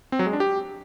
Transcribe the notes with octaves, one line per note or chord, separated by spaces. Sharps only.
C4
F#3
G#3
D4
G4